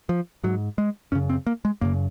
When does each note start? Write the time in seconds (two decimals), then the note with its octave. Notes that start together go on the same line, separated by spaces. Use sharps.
0.09 F3
0.44 G#2 F#3
0.78 G#3
1.12 F#2 C#3 C#4
1.30 C4
1.47 A#3
1.65 G#3
1.81 F#2 C#3 A#3